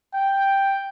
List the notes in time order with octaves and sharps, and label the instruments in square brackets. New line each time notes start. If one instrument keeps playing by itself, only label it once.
[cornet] G5